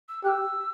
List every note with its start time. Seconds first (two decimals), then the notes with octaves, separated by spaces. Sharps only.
0.09 E6
0.24 G4 F#6
0.29 E6